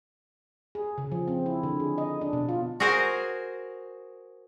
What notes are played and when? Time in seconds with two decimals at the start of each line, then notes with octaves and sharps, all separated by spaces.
0.75 G#4
0.98 C#3
1.12 F3
1.28 C4
1.46 E4
1.63 D3
1.80 G#4
1.98 D#5
2.21 D4
2.33 B2
2.49 F4
2.80 F#4 G#4 A#4 C5